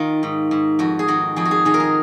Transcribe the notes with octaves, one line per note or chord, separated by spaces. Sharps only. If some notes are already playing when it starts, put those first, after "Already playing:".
Already playing: D#3 F4
G#2
G#2
F2 F#4
G#4
D#3 F#4
F2 G#4
F#4
G#4
D#3 G#4
A#4
G#4